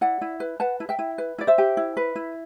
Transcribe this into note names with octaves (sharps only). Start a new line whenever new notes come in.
E4 D5 F#5
E4
B4
B4 F#5 A5
E4
E5 G5
E4
B4
E4 D5
C5 E5
G4
E4
B4
E4